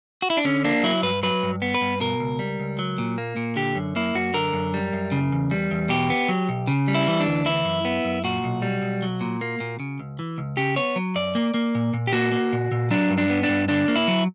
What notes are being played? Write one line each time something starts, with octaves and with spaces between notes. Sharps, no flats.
F#4
E4
D4
D3 C#4
A#3 D4
F#3 E4
G2 B4
F#3 B4
G2
B3
B4
G2
B2 A#4
C#2
G3
C#2
F#3
A#2
A#3
A#2
D3 G4
F#2
A#3 E4
F#2 F#4
D3 A#4
F#2
G3
F#2
C#3
E2
G3
E2
B2 G4
B3
F#3
B1
C#3
G3
E4
E3
D4
D2
E3 E4
F#2
B3
F#2
A#2 F#4
B1
G3
B1
F#3
A#2
A#3
A#2
C#3
C#2
E3
C#2
C#3 G4
B3 C#5
F#3
F#2 D5
A#3
A#3
A#2
A#2
G4
A#3 F#4
A#3
A#2
A#2
F#3 D4
G2
D4
B3
D4
G2
D3 D4
A#3
E4
F#3